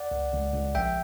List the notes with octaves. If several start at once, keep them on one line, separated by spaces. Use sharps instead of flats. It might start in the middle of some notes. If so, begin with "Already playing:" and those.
Already playing: D5 F#5
C#2
C#2
C#2
A#1 E5 G5